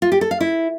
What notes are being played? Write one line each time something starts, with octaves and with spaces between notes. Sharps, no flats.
F4
G4
A4
F5
E4